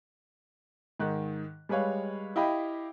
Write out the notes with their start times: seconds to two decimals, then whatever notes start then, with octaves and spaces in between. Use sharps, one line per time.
1.00 G#2 D#3 F#6
1.69 G3 G#3 B4 C#5 F5
2.36 E4 G4 D#5 F5 G5 B5